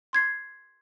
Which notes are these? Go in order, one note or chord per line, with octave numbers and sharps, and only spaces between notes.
C6 G#6 C7